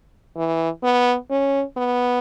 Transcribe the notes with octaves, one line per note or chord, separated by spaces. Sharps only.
E3
B3
C#4
B3